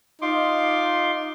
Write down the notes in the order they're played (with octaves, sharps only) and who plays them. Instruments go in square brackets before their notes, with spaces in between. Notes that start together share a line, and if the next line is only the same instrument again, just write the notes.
[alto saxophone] D#4 [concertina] F4 C6 D6